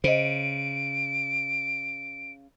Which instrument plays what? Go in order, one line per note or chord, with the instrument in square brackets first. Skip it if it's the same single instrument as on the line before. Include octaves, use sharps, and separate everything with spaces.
[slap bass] C#3 [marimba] C5 D#5 [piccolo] D7